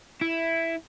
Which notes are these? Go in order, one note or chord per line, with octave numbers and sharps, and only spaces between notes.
E4